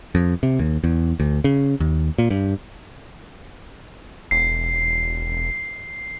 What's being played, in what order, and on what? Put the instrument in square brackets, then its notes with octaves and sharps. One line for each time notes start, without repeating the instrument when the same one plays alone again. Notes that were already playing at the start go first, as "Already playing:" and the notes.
[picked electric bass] F2
C3
D#2
E2
D2
C#3
D#2
A#2
G2
[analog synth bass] E1 [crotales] C7